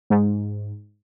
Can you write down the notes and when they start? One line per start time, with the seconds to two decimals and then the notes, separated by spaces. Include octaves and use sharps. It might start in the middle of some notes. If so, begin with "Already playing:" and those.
0.10 G#2